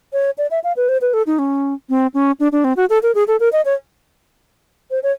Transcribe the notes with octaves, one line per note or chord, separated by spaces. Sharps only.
C#5
D5
E5
F5
B4
C5
B4
A4
D#4
C#4
C4
C#4
D4
D4
C4
F#4
A4
A#4
G#4
A4
A#4
D#5
C#5
C5
C#5